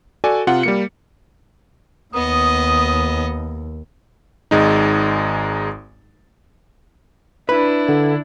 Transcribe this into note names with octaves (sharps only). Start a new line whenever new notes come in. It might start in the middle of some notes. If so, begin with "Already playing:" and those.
F#4 A4 D5 G#5
C3 F4 F#5
G3 A#3 C#7
D#2 B3 D#5 D#6
G#1 G#3 D#4
D4 E4 B4
D3